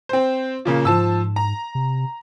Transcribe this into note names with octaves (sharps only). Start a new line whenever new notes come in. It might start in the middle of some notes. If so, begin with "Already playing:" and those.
C4 C5
A#2 C#3 A#3
G#2 F3 A5 E6
A#5
C3